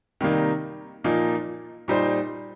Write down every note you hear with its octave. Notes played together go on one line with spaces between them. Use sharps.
C3 D#3 G3 A#3 D#4
A#2 F3 A#3 D#4
A#2 G3 D#4 C5